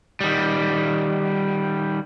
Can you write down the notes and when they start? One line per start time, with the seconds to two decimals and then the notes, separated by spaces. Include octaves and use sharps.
0.21 D#3 G3